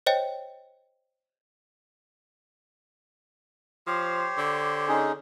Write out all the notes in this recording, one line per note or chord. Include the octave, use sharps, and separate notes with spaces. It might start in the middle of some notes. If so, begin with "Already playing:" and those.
C5 C#5 D#5 G5
F3 G4 C5 C#5
D3
C#4 D#4 G#4